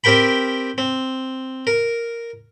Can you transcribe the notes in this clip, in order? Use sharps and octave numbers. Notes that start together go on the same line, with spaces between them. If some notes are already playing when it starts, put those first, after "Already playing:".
C4 G4 A#4 G5 B5
C4
A#4